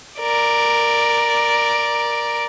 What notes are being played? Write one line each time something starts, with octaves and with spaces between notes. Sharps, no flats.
A#4 D5